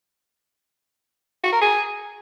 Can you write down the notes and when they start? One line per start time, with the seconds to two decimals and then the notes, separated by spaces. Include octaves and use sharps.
1.43 F#4
1.52 A#4
1.61 G#4